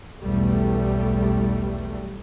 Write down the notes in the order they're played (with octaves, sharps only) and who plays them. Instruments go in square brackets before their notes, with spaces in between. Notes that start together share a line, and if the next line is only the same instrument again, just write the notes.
[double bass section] B1 E2 G3 A3